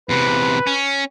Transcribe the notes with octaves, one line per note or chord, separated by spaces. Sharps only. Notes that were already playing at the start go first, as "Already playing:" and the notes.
E2 C3 B4
C#4